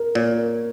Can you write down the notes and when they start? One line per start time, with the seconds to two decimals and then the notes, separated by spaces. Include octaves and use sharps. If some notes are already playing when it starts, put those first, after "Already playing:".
Already playing: A#4
0.15 A#2 C#5
0.38 A#4